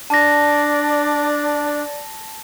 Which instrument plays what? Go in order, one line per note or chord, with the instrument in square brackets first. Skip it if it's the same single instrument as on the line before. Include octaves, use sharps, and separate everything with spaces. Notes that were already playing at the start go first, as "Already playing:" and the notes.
[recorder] D4 [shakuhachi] D5 [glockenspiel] A5 A#6